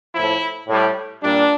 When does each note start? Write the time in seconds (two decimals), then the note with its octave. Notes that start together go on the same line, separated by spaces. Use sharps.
0.14 A2 F3 E4
0.68 A2 G3
1.21 A#2 G3 D4